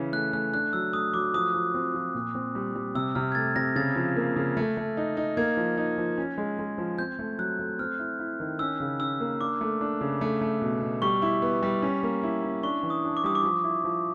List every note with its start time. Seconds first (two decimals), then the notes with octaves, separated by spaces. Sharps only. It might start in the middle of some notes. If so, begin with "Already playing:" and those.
Already playing: C#3 E3 C#4
0.13 A3 F#6
0.33 A3 F#6
0.53 D4 F#6
0.73 F#3 E6
0.93 A3 D#6
1.14 F#3 D6
1.34 F3 D#6
1.54 F3
1.74 C4
1.94 F3
2.15 A#2
2.35 C4
2.55 G3
2.75 G3
2.95 C3 E6
3.15 C3 F6
3.32 G#6
3.35 A3 A6
3.56 C3 A#6
3.76 C#3 A6
3.96 F3
4.16 A#3
4.36 C#3
4.57 A3
4.77 A3
4.97 D#4
5.17 D#4
5.37 A#3 G#6
5.57 F3
5.77 D#4
5.98 F3
6.18 C#4
6.38 G#3
6.59 G#3
6.78 F3
6.99 C4 G6
7.19 A3
7.39 F#3 F#6
7.59 A3
7.79 C4 F6
7.99 E4
8.19 E4
8.40 D#3
8.59 C#4 E6
8.80 C#3
9.00 C#4 E6
9.20 A#3
9.41 D4 D6
9.61 A3
9.81 D4
10.01 C#3
10.21 A3
10.41 A3
10.62 B2
10.82 B2
11.02 G3 C#6
11.22 E4
11.42 B3
11.63 G3
11.82 C#4
12.03 A#3
12.23 E4
12.43 C#4
12.63 D4 C#6
12.83 E3
12.90 D#6
13.04 D4
13.17 D6
13.24 G3 D#6
13.35 D6
13.44 F3
13.64 E4
13.84 F3